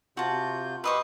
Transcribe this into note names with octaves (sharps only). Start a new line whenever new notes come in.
C3 F4 F#4 A5 G6
G4 B4 D#5 C6 C#6 E6